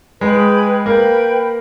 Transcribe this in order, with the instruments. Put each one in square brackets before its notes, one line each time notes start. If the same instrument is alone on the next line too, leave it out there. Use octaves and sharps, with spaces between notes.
[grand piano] G#3 [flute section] G#4 B4 G5 B5
[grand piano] A#3 [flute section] B4 G5 B5